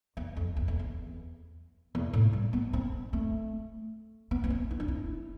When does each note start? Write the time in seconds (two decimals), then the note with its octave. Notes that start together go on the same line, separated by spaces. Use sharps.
0.17 E2
0.37 F2
0.57 E2
0.68 F2
0.79 E2
1.95 E2
2.13 A2
2.33 G3
2.53 B3
2.73 C4
3.13 A3
4.31 B3
4.44 B3
4.50 C4
4.71 E4
4.80 D4
4.88 E4